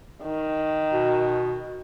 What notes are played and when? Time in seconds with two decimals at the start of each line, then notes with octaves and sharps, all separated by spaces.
0.23 D#3
0.93 B2